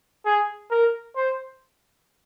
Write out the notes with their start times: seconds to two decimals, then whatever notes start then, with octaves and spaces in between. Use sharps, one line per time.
0.25 G#4
0.71 A#4
1.16 C5